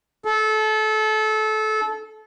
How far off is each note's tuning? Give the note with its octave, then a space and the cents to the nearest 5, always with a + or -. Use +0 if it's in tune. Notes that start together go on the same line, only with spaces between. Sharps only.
A4 -25